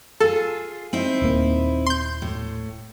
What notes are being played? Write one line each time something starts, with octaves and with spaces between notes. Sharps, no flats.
F4 G#4 A4
C4 D#4 E4
D#1 A#3
C6 G6
A2